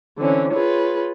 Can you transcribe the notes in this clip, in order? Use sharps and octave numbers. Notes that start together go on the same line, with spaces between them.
D3 E3 C4 C#4
F4 G#4 B4 C#5